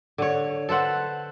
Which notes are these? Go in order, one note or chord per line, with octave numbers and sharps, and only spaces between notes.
D3 C#5
A4 B4 C5 F#5